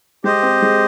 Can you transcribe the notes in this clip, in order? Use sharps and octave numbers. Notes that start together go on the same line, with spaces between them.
G#3 G4 C5 D#5
C4
G#3